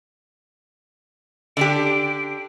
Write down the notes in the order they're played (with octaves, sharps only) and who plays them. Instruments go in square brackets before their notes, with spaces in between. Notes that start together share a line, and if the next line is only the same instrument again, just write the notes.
[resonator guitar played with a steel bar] D3 D4 G4 [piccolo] D7